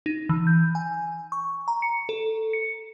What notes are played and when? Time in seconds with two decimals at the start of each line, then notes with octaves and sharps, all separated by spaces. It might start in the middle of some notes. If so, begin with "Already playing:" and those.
0.06 D#4
0.29 E3
0.47 G6
0.75 G#5
1.32 C#6
1.68 A#5
1.82 C#7
2.09 A4
2.53 C#7